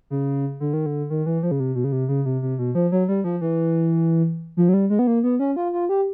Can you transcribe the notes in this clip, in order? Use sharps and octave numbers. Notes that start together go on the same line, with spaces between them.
C#3
D3
D#3
D3
D#3
E3
F3
C#3
C3
B2
C#3
C3
C#3
C3
C3
B2
F3
F#3
G3
F3
E3
F3
F#3
G3
G#3
B3
A#3
B3
C#4
F4
F4
G4